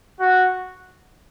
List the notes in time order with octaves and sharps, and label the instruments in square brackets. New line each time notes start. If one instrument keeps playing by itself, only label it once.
[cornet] F#4